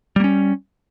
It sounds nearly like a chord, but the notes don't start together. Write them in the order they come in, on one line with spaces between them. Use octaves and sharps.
G3 A#3 C#4